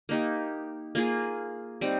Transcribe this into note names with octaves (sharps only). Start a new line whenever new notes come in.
A#3 D#4 G4
A#3 F4 G#4
G3 C4 D#4